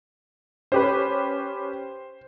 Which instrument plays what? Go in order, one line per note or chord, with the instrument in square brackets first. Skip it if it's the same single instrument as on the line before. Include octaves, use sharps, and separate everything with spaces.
[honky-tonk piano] C#4 G4 B4 [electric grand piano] C5